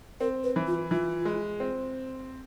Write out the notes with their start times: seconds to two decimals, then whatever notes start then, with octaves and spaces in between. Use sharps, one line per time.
0.20 C4 A#4
0.44 B4
0.56 E3
0.67 F4
0.91 E3 F4
1.25 G#3
1.60 C4